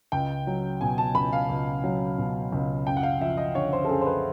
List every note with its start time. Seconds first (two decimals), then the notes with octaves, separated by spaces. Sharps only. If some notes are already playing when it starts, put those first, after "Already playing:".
0.12 C#2 G5
0.47 F#3
0.81 B2 G#5
0.98 A5
1.15 C#2 B5
1.33 F5
1.49 C#2
1.84 F#3
2.18 B2
2.52 C#2
2.87 F#2 G5
2.97 F#5
3.03 F5
3.21 F3 E5
3.37 D#5
3.55 D3 C#5
3.73 C5
3.84 A4
3.89 F#2 G#4
4.01 C5
4.06 B4